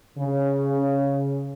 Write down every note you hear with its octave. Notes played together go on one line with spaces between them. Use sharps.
C#3